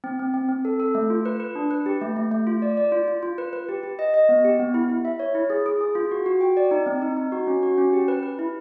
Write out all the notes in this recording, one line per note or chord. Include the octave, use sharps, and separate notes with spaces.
C4
C4
C4
C4
A4
A4
A3
F4
B4
B4
D4
B4
G4
A3
A3
A3
F4
D5
D5
F4
F4
F4
B4
B4
G4
G4
D#5
D#5
B3
G4
B3
E4
E4
E5
C#5
E4
G#4
G#4
G#4
F4
F#4
F#4
G5
D5
D#4
C4
D#4
D#4
F#4
C#4
F#4
C#4
G4
B4
B4
E4